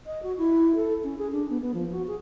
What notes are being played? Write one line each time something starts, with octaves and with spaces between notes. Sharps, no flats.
D#5
F#4
E4
A4
C#4
G#4
D4
B3
B3
F3
F#4
G#4